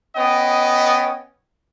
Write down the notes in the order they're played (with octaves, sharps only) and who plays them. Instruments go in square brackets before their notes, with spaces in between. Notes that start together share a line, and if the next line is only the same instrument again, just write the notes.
[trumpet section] B3 C#4 D#5 G5